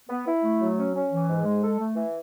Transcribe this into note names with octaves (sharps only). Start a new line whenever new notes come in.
B3
E4
A3
F#3
C#4
C#4
E3
G#2
G#3
A4
A3
E3